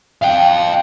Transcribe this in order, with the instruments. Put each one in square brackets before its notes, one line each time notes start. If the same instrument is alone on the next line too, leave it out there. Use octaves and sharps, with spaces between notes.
[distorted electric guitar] F5 G5